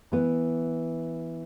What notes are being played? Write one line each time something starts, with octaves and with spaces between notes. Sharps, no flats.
E3 B3